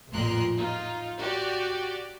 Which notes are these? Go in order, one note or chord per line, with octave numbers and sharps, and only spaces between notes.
A1 F2 A#2 A#4 C6 F#6
D#4 F4
F#4 G4 D5